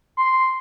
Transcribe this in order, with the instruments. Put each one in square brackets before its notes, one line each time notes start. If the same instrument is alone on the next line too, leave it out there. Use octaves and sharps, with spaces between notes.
[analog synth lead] C6